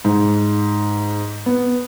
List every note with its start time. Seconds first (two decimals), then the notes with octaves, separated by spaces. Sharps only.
0.05 G#2
1.46 B3